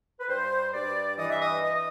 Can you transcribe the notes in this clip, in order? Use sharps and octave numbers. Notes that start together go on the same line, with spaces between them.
B4
G2 C5
G2 D5
E3 D#5
E5
D#5
E3 D#5